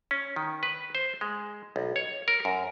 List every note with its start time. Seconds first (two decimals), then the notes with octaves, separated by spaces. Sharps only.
0.11 C#4
0.36 D#3
0.63 B4
0.95 C5
1.21 G#3
1.76 B1
1.96 C#5
2.28 A#4
2.45 F#2